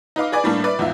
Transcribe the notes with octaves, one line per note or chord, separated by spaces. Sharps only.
D#4 B4 F5 D6
G#4 B4 D5 G#5
A2 G3 A#3 D4
E4 B4 D5
E2 G#2 F4 E5